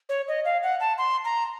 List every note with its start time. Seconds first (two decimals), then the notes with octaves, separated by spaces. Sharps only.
0.09 C#5
0.28 D#5
0.45 F5
0.63 F#5
0.80 A5
0.98 C6
1.25 A#5